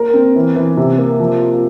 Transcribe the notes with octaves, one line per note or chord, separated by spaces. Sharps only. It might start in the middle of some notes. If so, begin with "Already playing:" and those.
Already playing: A#3 A#4
C4
E3
E3
C3
A#3
F3
F4